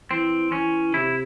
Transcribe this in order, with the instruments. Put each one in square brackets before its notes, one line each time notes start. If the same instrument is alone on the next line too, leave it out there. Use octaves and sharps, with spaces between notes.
[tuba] E3 [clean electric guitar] C4
[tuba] E3 [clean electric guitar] C#4
[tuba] C3 [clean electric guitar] E4